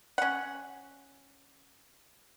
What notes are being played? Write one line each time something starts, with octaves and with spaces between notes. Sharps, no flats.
C#4 F#5